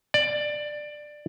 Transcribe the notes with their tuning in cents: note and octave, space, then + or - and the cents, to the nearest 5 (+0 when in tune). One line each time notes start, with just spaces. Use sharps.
D5 +15